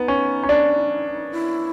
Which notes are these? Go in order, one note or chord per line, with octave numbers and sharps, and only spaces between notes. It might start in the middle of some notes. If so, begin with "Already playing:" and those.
Already playing: B3 D#4
C#4
C#4
D4
E4